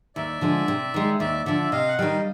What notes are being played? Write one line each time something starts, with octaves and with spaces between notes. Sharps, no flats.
D#2 D5 E5
D3 F3 G#3
C3
D#3 G#3
D#2 D5 E5
D3 F3 D5 E5
C3 D#5 F5
F#5
D#3 G3 D#5 F5